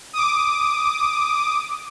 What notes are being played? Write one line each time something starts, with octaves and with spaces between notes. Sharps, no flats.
D6 D#6